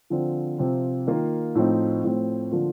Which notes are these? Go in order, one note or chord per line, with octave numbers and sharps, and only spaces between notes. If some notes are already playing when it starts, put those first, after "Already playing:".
D3 F3 C4 F4
C3 F3 C4 F4
D#3 A#3 F4
A2 F3 C4 D#4
A2 F3 C4
D3 F3 A#3 F4